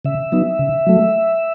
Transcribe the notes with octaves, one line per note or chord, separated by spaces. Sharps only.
C#3 E5
F#3 B3 D#4
C#3
F#3 A3